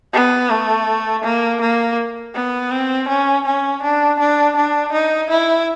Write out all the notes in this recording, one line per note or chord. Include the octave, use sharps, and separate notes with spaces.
B3
A3
A#3
A#3
B3
C4
C#4
C#4
D4
D4
D4
D#4
E4